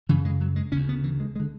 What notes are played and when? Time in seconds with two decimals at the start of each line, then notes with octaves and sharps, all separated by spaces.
0.09 F#2 C#3 E3
0.25 G#3
0.41 F#3
0.56 G#3
0.72 D2 C#3 C#4
0.89 B3
1.04 E3
1.20 G#3
1.36 G#3
1.40 D3